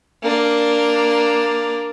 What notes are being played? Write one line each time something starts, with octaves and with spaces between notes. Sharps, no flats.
A#3 D4